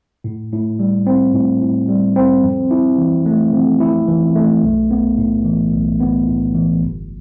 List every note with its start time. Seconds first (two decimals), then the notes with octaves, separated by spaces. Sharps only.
0.24 A2
0.52 A2
0.79 G3
1.07 C4
1.34 A2
1.62 A2
1.89 G3
2.16 C4
2.43 F2
2.71 E4
2.98 E3
3.26 A3
3.53 F2
3.80 E4
4.08 E3
4.36 A3
4.63 B1
4.91 B3
5.18 A2
5.45 E3
5.73 B1
6.01 B3
6.27 A2
6.54 E3
6.82 G1